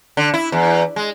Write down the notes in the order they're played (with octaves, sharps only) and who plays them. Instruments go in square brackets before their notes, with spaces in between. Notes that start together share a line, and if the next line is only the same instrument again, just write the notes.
[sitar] D3
E4
E2
G#3